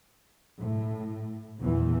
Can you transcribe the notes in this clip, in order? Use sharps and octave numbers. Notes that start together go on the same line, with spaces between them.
A2
E2 A#2 E3